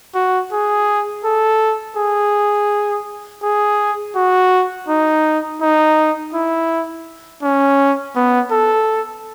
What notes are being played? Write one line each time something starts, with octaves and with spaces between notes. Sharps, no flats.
F#4
G#4
A4
G#4
G#4
F#4
D#4
D#4
E4
C#4
B3
A4